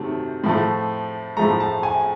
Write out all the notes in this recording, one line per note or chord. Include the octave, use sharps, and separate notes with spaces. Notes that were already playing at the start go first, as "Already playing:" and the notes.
Already playing: C3 D#3 F#3 A3
A2 F3 A3
A2 F3 A3 A#5
A5
G#5